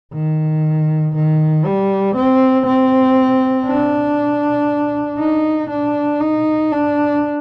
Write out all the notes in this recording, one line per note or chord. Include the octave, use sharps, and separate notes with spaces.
D#3
D#3
G3
C4
C4
D4
D#4
D4
D#4
D4